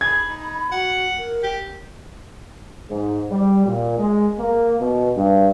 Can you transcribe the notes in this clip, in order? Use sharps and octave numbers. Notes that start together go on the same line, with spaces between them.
G#4 B5 G#6
D#4
F#4 F#5
A#4
G4
G#2
G3
A#2
G#3
A#3
B2
G2